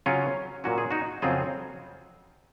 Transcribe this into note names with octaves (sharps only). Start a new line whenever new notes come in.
C#3 F#3 C#4 F4
A#2 F#3 C#4 F#4
G#4
D#4 F#4
F2 C#3 F#3 C4 F4 G#4